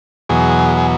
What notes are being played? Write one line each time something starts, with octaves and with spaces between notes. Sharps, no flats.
E2 B2 F#3 G#4
G#4